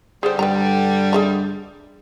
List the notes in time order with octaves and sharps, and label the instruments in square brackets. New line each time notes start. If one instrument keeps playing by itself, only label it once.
[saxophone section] D3 G3 [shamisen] G#4 C5
[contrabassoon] G2 [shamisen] B4 G5 A#5
[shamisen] G#4 E5 A#5